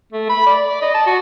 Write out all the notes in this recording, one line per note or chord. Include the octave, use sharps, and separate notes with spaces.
A3
B5
D5
D5
D#5
A5
F#4